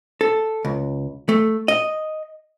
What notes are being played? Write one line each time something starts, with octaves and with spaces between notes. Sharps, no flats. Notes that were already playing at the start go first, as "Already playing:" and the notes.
A4
C#2
A3
D#5